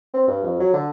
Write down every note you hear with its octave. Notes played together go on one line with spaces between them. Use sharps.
C4
G2
F2
F#3
D3